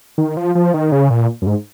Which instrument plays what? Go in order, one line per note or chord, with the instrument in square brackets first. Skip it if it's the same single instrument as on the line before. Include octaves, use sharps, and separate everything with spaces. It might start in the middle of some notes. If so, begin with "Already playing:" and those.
[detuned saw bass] D#3
F3
F3
D#3
C#3
A#2
F#2
G#2